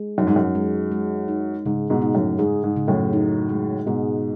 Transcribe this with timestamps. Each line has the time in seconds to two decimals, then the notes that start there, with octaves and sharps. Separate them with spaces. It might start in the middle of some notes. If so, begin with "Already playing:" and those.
Already playing: G#3
0.18 F#2 D#4
0.27 G#2
0.36 F#2
0.55 G#3
0.92 G#3
1.28 D#4
1.66 G#2 C#3
1.90 G#2 B2
2.02 D#4
2.15 F#2 A2
2.38 G#2 G#4
2.63 G#2
2.76 C#3
2.88 F#2 A2
3.13 D#4
3.49 G#3
3.86 G#2 B2 G#4